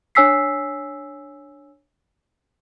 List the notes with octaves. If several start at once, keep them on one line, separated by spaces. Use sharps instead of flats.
D4 C#5 G#5 E6 B6 C7